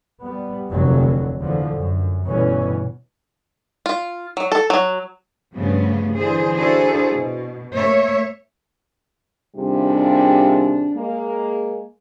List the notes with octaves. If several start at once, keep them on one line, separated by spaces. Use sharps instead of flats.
G3 B3
F1 D#2 D3 F#3
E2 D3 F3
F#2
G1 B2 E3 B3 C#4
F4
F#3
A4
F#3
G2 C#3 F3 A3 B3
D3 E3 G#4 C5
D4 E4 F#4 G#4 A4 C5
B2
A3 A#3 C#5 E5
D#2 C3 G3 D4 F4 G#4
G#3 A#3